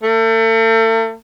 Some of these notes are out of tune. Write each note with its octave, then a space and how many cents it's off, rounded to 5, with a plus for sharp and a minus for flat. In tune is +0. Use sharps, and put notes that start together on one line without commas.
A3 +40